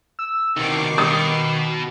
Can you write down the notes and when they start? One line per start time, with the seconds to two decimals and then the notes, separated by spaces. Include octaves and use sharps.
0.19 E6
0.57 C2 B2 D#3 C#6 D6 C7
0.98 B2 D#6